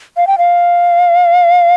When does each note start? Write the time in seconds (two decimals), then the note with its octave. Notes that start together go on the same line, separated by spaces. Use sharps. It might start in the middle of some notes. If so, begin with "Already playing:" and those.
0.17 F5
0.27 G5
0.38 F5